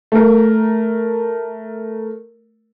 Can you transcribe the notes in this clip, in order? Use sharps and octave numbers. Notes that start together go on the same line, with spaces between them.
A3 A#4